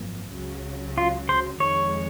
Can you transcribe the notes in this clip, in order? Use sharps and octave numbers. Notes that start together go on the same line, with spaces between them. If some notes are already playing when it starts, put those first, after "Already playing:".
Already playing: G#1 F#2 F3 A#3
C#2 C#3 F#3
F4
C5
F2 D#3 G#3 C#5